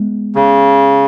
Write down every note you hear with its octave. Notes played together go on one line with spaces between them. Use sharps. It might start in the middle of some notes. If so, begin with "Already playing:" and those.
Already playing: G#3 B3
C#3